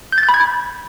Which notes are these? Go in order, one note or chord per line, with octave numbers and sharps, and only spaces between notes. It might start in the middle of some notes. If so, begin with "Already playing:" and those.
G6
A6
G6
B5
G#6